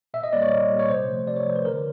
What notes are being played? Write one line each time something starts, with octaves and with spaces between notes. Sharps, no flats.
A#2 E5
D#5
G3 A#3 D5
C#5
A#2
G3 A#3
C#5
C3 C5
F3 A3
C3 D5
C#5
F3 A3 C5
B4
D3 A#4